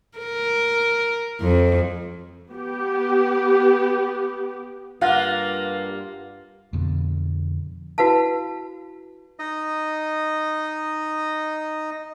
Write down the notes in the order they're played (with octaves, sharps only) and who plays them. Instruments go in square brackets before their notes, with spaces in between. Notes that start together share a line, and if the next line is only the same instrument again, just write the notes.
[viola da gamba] A#4
F2
[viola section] B3 G4
[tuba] G2 [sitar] A#3 F4 [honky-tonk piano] F5 F#6 A#6 [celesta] F#5
[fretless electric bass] F2 B2 D3
[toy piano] E4 F#4 B4 F5 A5
[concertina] D#4 D#5